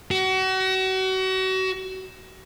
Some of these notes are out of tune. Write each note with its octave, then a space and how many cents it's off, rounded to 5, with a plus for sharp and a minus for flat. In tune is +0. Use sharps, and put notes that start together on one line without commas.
F#4 +35